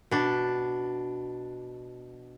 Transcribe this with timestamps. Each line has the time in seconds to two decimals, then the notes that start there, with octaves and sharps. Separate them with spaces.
0.11 B2 D4